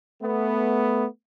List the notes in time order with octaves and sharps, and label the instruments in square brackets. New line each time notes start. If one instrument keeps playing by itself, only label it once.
[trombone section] A3 B3